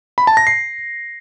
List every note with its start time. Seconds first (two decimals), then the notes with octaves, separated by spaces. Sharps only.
0.18 B5
0.27 A5
0.37 A#6
0.47 C7